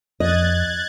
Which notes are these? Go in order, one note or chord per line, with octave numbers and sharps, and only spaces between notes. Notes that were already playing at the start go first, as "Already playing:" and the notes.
F2 D#5 F#6 G#6 A6